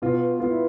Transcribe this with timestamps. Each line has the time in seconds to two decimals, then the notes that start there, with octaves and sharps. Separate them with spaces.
0.02 B2 F4
0.40 B3 F4
0.50 E4